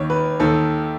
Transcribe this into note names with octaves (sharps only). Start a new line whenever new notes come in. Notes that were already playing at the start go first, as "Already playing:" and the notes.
Already playing: D#2 D#3 C#5
B4
D#2 D#3 A4